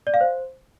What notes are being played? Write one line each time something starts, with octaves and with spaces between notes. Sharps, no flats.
D5
F5
C5